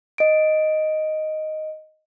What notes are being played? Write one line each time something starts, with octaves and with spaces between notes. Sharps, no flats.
D#5 D7